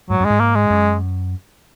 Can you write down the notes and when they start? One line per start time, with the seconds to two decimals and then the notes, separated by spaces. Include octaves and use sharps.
0.10 G#2 F#3
0.20 F#2 G#3
0.30 G#2
0.40 A#3
0.55 G#3
0.70 F#2